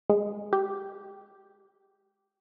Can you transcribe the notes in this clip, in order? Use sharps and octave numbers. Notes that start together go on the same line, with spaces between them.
G#3
G4